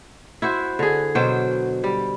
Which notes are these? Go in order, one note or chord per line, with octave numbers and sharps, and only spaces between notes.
E4 F#4 C5
D3 G#4
B2 F#3 C5 G5
G3